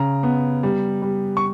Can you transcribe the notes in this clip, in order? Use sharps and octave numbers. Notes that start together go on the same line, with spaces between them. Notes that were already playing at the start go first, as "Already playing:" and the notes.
Already playing: C#3 A#5
B3
G3
G3
C#6